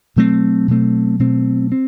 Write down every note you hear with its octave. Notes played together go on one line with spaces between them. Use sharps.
B2 F#3 A3 C4
B2 F#3 A3 C4
B2 F#3 A3 C4
C4